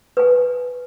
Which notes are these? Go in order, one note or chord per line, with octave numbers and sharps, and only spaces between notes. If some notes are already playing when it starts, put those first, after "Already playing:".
B4 G#5